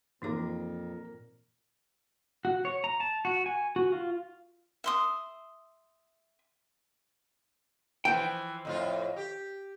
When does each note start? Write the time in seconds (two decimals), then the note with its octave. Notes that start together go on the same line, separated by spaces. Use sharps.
0.22 F2 A#2 E3 A#3 D#4 A#4 D6
2.45 F#4
2.65 C#5
2.84 A#5
3.00 A5
3.25 F#4
3.46 G#5
3.76 F#4
3.92 F4
4.84 E5 C6 D#6
8.05 E3 F3 G5
8.65 F2 A2 F4
9.16 G4